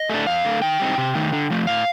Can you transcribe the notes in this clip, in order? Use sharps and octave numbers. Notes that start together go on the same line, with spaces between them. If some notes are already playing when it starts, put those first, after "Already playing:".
Already playing: D#5
A3 D4
F2 F5
D3 A3
D#3 G5
G3 C4 D#4
C3
D#3 A3 D#4
D3
F3 A3
A2 F5